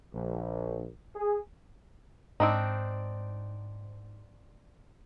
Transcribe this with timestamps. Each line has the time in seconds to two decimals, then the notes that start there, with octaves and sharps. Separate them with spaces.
0.13 A#1
1.15 G#4
2.40 G#2 C4 D4 D#4